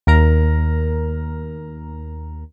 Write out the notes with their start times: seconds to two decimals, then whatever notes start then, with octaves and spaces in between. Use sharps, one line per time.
0.07 D#2 A#4 A#5